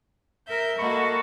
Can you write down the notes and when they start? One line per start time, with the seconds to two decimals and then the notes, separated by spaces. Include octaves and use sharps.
0.47 A#4 E5 G6
0.79 A#3 F#4 A4 D#5 B5 C#6